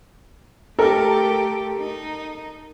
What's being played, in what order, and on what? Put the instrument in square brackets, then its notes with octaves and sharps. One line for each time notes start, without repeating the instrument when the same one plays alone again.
[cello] A3 G4 [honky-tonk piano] A4 A#4
[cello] D#4